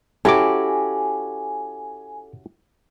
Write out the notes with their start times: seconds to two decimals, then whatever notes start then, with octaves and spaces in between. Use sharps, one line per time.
0.25 C#4 E4 F#4 G4 A4 G#5 D6